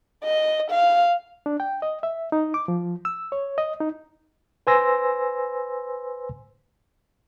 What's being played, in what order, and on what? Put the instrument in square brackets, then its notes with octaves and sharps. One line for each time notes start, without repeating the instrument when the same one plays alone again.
[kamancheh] D#5
F5
[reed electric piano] D4
G5
D#5
E5
D#4
D6
F3
E6
C#5
D#5
D#4
[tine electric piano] B4 C5 G#5 C6 E6 A#6